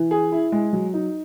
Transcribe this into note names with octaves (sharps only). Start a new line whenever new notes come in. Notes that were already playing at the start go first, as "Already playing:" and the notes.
Already playing: E3
G#4
E4
G#3
F#3
D#4